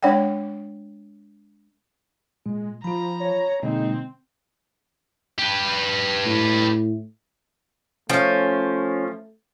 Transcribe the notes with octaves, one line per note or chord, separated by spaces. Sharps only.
G#3 D4 C#5 D5 F#5 G5
A#2 G#3
F3 F4 A#5 B5
C#5
B2 D3 G#3 A#3 C4 D#4
G4 B4
A2
F3 A3 C#4